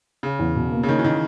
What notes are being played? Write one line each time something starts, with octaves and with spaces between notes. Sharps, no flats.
C#3 C#4
E2
B2
A#3
C#3
D#3 C#4
E3
D#3